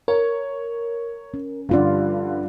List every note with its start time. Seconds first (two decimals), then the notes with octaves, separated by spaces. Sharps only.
0.08 A#4 C#5
1.34 C#4
1.69 G2 D3 G3 F4 D5